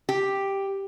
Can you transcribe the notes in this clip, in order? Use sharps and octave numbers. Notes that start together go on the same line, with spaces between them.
G4